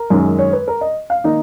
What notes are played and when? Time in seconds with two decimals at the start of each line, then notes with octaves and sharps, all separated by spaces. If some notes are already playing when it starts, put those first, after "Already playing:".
Already playing: A#4
0.10 F#2 D#3 G#3
0.39 C#5
0.53 B4
0.68 A#4
0.81 D#5
1.10 F5
1.24 D#3 A#3 D#4 D#5